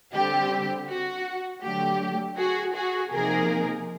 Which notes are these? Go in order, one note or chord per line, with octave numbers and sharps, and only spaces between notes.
D3 G3 C4 G4
F#4
D3 F#3 A3 G4
F#4 G#4
F#4 G#4
C3 F3 A#3 D#4 G#4 A#4